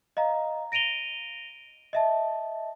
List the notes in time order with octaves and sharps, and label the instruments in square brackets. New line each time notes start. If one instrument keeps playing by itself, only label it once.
[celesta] D#5 F5 A#5
A#6 D7 D#7 F7 G7
D#5 E5 A5